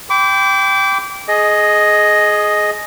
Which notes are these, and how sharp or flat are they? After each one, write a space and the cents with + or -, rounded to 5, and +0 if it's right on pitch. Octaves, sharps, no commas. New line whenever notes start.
G5 +0 B5 +45 D6 -25
G#4 +20 D#5 +0